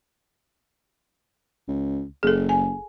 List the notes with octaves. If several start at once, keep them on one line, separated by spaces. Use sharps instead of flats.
C#2
F#1 G#4 A4
G#5